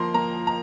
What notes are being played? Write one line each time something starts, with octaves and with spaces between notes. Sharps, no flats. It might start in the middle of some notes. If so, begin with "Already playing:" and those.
Already playing: F3 A#3 A#5 C6
A#3 A#5
A#5